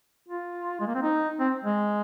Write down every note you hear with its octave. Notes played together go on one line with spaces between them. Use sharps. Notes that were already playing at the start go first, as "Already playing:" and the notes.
F4
G#3
A#3
C4
D#4
C4
G#3